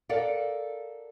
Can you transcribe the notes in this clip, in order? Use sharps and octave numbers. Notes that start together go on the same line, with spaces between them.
A4 A#4 D5 F5 F#5